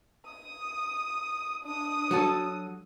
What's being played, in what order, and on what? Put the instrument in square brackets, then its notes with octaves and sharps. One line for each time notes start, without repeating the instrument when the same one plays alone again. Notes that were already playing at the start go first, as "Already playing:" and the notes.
[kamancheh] D#6
D4 D#6
[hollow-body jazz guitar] F#3 F#4 A4